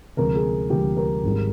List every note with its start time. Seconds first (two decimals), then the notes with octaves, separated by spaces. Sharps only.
0.17 D2 C3 F3 G#3 A#4
0.36 G#4
0.70 D2 C3 F3 G#3 G4
0.97 A#4
1.23 G#1 G#2 G3